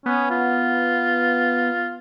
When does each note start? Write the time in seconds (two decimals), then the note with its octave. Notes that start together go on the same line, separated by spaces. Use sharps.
0.06 B3 C#4
0.31 F4